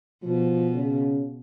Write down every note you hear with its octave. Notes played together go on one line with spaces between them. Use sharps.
B2 F3
C#3